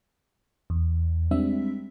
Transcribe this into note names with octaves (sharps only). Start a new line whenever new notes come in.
E2
G3 G#3 C4 D4 E5